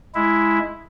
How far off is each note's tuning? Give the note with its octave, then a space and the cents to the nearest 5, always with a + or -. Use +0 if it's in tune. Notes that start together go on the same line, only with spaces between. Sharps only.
G#3 +5 E4 +0